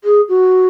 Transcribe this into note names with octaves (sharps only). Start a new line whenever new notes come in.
G#4
F#4